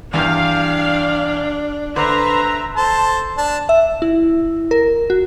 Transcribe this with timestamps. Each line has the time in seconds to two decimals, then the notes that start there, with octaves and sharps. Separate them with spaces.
0.13 E2 G2 D4 G4 F5
1.96 D3 B4 C5 E5 A#5
2.76 A4 C5 A5
3.38 D4 A5
3.69 E5
4.02 E4
4.71 A#4
5.10 F#4